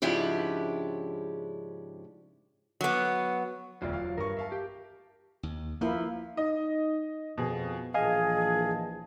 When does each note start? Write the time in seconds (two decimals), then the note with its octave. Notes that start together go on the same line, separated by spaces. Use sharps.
0.02 G#2 C#3 F3 D4 E4 G4
2.81 F#3 B3
3.82 E1 D2 F#3 F4 D5
3.93 F5
4.18 G2 A#4 C#6
4.37 E5 F5 A5
4.52 G4
5.43 D#2
5.81 F3 A#3 E4
6.37 D#4 D#5
7.38 F2 B2 G#4
7.94 A#1 E3 G#4 D#5 F5 G#5 A5